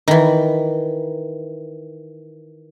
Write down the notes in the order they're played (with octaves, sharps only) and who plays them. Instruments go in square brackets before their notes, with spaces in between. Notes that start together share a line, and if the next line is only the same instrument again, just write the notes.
[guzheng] D#3 E3